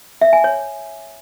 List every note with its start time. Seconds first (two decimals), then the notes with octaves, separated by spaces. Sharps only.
0.21 E5
0.33 G#5
0.44 C#5